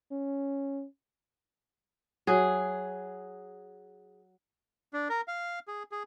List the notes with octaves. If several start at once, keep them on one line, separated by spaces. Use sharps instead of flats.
C#4
F#3 G#4
D4
A#4
F5
G#4
G#4